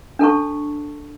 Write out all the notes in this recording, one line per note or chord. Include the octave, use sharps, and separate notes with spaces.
D4 A4 A5 C#6